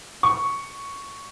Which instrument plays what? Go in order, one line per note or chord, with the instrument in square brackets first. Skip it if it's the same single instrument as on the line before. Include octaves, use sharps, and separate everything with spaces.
[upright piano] C#6